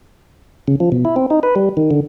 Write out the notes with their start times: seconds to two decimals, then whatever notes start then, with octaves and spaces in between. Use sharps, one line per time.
0.68 C#3
0.80 F3
0.92 B2
1.05 E4
1.16 C4
1.30 D#4
1.43 B4
1.56 G3
1.77 D#3
1.91 D3